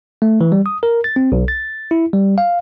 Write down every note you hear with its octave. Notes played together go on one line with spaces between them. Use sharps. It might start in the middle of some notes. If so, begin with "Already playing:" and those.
A3
E3
G3
D#6
A#4
A6
C4
B1
A6
E4
G3
F5